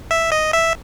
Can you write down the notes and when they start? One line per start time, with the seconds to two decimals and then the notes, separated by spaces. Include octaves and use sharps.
0.11 E5
0.32 D#5
0.53 E5